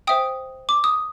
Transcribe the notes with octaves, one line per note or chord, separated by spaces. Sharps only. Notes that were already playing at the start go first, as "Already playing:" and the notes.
C5 E5 G5 D#6
D6
D#6